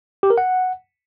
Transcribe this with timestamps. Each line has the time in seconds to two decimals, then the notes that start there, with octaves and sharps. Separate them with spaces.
0.23 G4
0.30 A#4
0.38 F#5